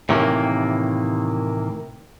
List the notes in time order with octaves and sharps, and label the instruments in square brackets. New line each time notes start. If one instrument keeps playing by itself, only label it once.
[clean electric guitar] A2 C3 D#3 E3 G3 A#3